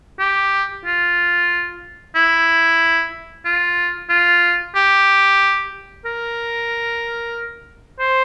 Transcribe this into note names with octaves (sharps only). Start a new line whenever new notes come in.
G4
F4
E4
F4
F4
G4
A#4
C5